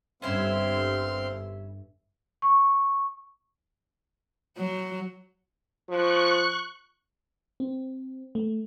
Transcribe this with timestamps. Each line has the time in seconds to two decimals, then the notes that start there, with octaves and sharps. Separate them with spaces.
0.22 G1 G2 C4 C#4 E4 E5 F5 C6
2.42 C#6
4.57 F#3
5.89 F3 C#6 F#6
7.60 C4
8.35 A3